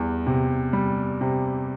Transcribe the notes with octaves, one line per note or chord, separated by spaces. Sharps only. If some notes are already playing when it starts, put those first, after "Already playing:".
Already playing: E2 G3
C3
G3
C3